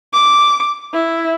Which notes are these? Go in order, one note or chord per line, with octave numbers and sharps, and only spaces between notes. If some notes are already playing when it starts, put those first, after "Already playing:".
D6
E4